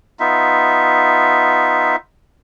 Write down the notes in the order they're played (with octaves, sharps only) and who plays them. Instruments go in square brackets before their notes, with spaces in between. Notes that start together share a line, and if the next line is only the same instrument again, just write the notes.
[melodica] B3 D#4 F4 E5